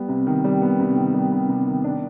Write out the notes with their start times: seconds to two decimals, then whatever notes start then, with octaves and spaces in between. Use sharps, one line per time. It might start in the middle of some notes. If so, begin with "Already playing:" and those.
Already playing: G3 B3
0.08 C3
0.27 D#3
0.44 G3
0.62 B3
0.80 C3
0.96 D#3
1.14 G3
1.31 B3
1.49 C3
1.67 D#3
1.84 D4